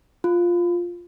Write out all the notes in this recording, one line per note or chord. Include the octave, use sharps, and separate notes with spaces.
F4